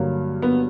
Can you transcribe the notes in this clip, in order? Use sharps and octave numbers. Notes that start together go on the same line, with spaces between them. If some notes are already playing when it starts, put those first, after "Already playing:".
Already playing: G2 D3 F#3 A#3
B3